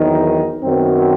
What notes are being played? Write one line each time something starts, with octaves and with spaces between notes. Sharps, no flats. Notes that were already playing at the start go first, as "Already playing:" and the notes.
Already playing: E2 D#3 F#3 C4 D#4
F#2 D#3 F#3 B3 C4